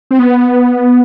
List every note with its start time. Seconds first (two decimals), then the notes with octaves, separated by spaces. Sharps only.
0.11 C4
0.19 B3